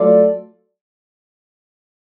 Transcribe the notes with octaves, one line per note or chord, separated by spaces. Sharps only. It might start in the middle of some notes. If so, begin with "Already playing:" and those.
Already playing: F#3 A3 F4 A4 D5